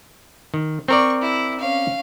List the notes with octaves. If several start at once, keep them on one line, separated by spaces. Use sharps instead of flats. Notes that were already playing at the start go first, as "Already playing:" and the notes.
D#3
C4 A#4 D5 C#6
E4
C#4 F5